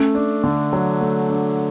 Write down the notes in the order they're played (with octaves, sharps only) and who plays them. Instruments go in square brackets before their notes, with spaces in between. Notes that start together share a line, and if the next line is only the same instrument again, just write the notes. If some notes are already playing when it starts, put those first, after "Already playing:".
Already playing: [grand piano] A3 [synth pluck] C#4
[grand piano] D4
D3
F#3
A3
D4